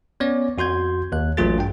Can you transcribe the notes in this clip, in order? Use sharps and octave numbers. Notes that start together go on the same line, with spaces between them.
B3 C#4 C#5 D5
F2 F#4 C6 G6 G#6
D#2 F#6
A1 F#3 A3 F4 G#4 A6
G2 G5